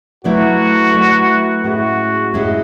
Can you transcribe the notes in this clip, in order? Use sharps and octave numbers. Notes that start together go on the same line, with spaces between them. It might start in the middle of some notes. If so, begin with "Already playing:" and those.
F#3 A3 E4 F#4 B4 D5
F#3 A3 E4 B4 D5
A2 G#3 C#4 E4 F#4 G#4
A2 G#3 C#4 E4 G#4